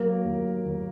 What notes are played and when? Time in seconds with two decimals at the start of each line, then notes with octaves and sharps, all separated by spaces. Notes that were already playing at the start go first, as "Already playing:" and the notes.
Already playing: F#3 A#3 A#4
0.24 D#2
0.64 D#2